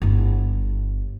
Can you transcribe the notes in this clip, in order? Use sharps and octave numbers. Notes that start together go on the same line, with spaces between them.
G1 E4